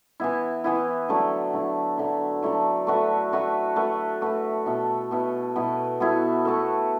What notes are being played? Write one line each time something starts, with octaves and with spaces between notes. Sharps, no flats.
E3 B3 E4
E3 B3 E4
D3 F#3 A3 E4
D3 F#3 A3 E4
D3 F#3 A3 E4
D3 F#3 A3 E4
A3 F#4 B4 E5
A3 F#4 B4 E5
A3 F#4 B4 E5
A3 F#4 B4 E5
B2 B3 E4 A4
B2 B3 E4 A4
B2 B3 E4 A4
B2 B3 E4 A4
A3 F#4 A4